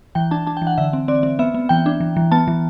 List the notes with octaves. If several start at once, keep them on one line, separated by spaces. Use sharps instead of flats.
E3 G5
D4 A5
D4 A5
G5
E3
F#5
D3 E5
C4
C4 D5
C4
B3 E5
B3
E3 G5
D4
E3
E3
B3 A5
E3